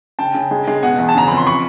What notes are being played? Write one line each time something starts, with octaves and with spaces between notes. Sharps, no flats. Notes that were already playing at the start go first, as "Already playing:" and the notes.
C#3 G5 A5
C#3
G#3
G#3
B2 F#5 G#5
E2
A5
C#3 A#5
F2 B5
C6
B5 C#6